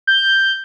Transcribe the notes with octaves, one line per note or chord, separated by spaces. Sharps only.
G6